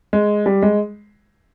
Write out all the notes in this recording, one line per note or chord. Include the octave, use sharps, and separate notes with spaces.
G#3
G3
G#3